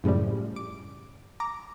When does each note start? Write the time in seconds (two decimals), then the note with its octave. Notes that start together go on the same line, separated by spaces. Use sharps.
0.04 F#2 A2 C#3 F3 G3
0.56 D6
1.40 A#5 D6